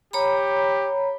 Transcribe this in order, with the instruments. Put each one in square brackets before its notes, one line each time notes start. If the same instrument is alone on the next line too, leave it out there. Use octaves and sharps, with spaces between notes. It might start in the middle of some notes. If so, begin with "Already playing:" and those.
[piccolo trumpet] G4 [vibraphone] C#5 A#5 B5